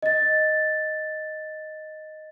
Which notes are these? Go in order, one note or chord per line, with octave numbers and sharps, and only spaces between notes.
D#5 A6